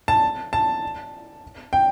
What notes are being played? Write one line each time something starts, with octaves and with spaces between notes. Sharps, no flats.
A5
A5
G5